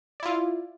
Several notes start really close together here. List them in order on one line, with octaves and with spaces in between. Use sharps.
D5 E4 F4